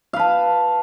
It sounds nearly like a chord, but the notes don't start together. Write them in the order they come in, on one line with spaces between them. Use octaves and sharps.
F5 B4 A5